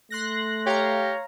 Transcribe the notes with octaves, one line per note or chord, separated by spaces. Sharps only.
A3 C6 F#6 A#6
G4 C#5 F5 A#5